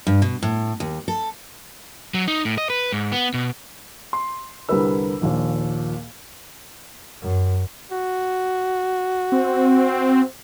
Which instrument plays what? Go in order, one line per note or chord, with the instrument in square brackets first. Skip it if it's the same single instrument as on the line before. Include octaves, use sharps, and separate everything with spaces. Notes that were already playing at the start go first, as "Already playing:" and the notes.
[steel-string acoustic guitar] G2
B2
A2
D#2
A4
[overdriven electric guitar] F#3
D#4
A2
D#5
B4
G#2
B3
B2
[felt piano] C6
C2 D3 G3 A#4 B4 E6
A#1 D#2 A#2
[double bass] F#2
[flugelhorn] F#4
[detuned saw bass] C4